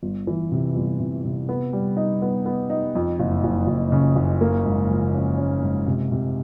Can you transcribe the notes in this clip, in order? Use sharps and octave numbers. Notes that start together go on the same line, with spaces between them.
G1
E3
C3
G1
C3
C3
B3
G3
D#4
B3
B3
D#4
F2
F#1
F#1
F#1
C#3
F#1
A#3
G#2
F3
C#4
C#4
G#2
C3
C3